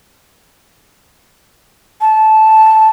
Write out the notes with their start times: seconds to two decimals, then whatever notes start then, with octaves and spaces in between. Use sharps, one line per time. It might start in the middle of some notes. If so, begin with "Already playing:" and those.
2.01 A5